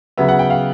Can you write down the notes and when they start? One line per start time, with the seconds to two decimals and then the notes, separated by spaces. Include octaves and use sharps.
0.18 C#3 F#3 B3 E5
0.28 F#5
0.39 G5
0.50 F5